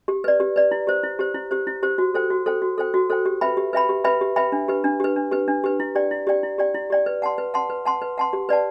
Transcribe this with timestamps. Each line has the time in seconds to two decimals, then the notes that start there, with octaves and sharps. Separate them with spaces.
0.08 G4
0.24 B4 D5
0.40 G4
0.56 B4 D5
0.71 E4
0.87 G4 C5
1.03 E4
1.19 G4 C5
1.34 E4
1.51 G4 C5
1.67 E4
1.83 G4 C5
1.98 F#4
2.14 A4 C5 G5
2.30 F#4
2.46 A4 C5 G5
2.62 F#4
2.78 A4 C5 G5
2.94 F#4
3.10 A4 C5 G5
3.25 G4
3.41 B4 E5 G5 B5
3.57 G4
3.73 B4 E5 G5 B5
3.89 G4
4.04 B4 E5 G5 B5
4.21 G4
4.36 B4 E5 G5 B5
4.52 D4
4.68 G4 B4
4.84 D4
5.00 G4 B4
5.16 D4
5.32 G4 B4
5.48 D4
5.64 G4 B4
5.80 E4
5.95 G4 D5 G5
6.11 E4
6.27 G4 D5 G5
6.43 E4
6.58 G4 D5 G5
6.74 E4
6.90 G4 D5 G5
7.06 B4
7.22 F#5 A5 C6
7.38 B4
7.54 F#5 A5 C6
7.70 B4
7.86 F#5 A5 C6
8.02 B4
8.18 F#5 A5 C6
8.33 G4
8.49 B4 D5 F#5 A5